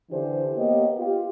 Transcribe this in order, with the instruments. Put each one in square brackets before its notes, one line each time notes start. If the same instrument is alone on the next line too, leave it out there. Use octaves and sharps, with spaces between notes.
[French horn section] D3 E3 D4 G4 C5
A#3 B3 G4 C#5 D#5
F4 G4